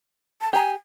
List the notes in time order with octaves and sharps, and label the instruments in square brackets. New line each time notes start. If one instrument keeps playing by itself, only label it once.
[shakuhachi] A5
[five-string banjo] G4 A#5 [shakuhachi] G#5